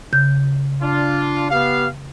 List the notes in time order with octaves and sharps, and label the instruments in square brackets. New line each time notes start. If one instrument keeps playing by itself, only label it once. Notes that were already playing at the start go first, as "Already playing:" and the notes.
[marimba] C#3 G6
[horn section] D4 F4
B3 G4 F5